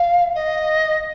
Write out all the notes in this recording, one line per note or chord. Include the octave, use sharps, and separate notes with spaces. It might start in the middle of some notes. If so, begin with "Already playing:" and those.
Already playing: F5
D#5